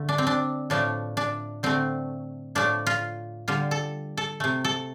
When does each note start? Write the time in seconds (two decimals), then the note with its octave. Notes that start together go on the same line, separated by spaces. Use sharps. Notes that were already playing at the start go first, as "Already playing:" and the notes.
Already playing: D3 A3
0.09 D4
0.18 C4
0.27 D4
0.70 A2 F3 A3 D4
1.17 D4
1.63 D3 A3 C4
2.55 A2 F3 A3 D4
2.87 F4
3.48 D3 G3 F4
3.71 A4
4.17 A4
4.40 C3 A3
4.65 A4